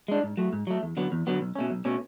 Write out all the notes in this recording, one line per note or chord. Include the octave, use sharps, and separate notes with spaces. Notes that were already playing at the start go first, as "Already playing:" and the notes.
G#3 D4
G#2
F#3 A3
G#2
F#3 A3
E2
D3 F#3 B3
E2
D3 F#3 B3
B1
B2 A3 C#4
B1
B2 A3 C#4